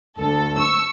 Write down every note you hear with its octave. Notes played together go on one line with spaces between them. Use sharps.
D2 A4
C#6 E6